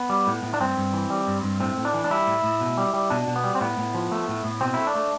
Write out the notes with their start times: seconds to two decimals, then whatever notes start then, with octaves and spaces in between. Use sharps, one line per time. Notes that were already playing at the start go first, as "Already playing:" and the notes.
Already playing: B3
0.10 G3
0.27 A2
0.43 A2
0.54 D4
0.60 G2 C4
0.78 G2
0.93 E3
1.10 G3
1.27 G2
1.43 G2
1.60 A2 C4
1.78 A2
1.85 D4
1.94 E3
2.04 D4
2.10 G3 E4
2.27 A2
2.43 A2
2.61 B2
2.77 G3
2.94 G3
3.10 B2 D4
3.27 B2
3.36 B3
3.44 G3
3.55 C4
3.61 A2 B3
3.78 A2
3.95 F3
4.12 A3
4.28 A2
4.44 A2
4.61 B2 C4
4.74 A3 E4
4.87 D4
4.95 A3